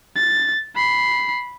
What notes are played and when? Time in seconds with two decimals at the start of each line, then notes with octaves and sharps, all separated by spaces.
0.16 A6
0.75 B5 C7